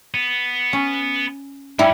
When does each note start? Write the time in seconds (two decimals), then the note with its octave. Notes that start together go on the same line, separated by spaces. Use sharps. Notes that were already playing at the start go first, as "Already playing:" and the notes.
0.14 B3
0.73 C#4
1.79 G2 G3 C#4 E4